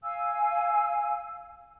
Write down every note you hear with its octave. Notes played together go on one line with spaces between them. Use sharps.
F5 G#5 E6